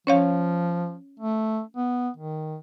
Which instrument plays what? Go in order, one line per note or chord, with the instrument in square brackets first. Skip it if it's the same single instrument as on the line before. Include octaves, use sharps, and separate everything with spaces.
[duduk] F3 [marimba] C#4 C#5 F5
[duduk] A3
B3
D#3